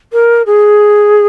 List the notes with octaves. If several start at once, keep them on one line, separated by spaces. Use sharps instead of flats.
A#4
G#4